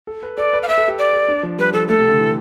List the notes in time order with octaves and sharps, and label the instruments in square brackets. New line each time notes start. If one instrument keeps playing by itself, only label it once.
[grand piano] A4
B4
[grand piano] A4 [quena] D5
[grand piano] B4
[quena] F5
[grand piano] B4 [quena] E5
[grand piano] A4
G4
[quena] D5
[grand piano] A4
D4
F3
[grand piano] G3 [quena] B4
[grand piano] F3 [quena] A4
[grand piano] A3 [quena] A4
[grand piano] C3
D3
E3